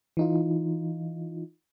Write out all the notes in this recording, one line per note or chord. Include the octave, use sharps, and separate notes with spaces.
E3 D#4 F4